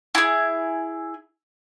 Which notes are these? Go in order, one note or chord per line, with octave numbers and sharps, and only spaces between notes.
E4 G#4